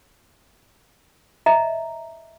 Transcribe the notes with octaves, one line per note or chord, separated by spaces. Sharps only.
D#5 E5 A#5